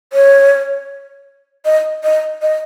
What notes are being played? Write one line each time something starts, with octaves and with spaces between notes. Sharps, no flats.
C#5
D#5
D#5
D#5